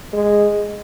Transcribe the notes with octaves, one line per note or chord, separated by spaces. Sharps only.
G#3